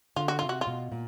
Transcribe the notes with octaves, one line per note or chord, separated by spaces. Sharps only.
D3 F4
F#4
C3 F4
F#4
F4
B2
A#2